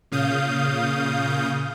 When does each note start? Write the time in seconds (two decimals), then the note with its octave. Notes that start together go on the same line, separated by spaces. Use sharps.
0.12 A#2 C#3 F5 D#6 G6